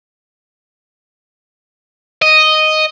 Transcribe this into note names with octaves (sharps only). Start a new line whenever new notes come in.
D#5